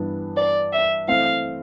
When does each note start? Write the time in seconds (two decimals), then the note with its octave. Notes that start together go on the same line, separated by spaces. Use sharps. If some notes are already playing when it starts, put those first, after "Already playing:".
Already playing: G2 E3 B3 D4
0.36 D5
0.72 E5
1.07 E3 A3 C4 E4 F5